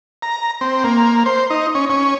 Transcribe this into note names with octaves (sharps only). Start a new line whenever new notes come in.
A#5
C4
A#3
C5
D#4
C#4
C#4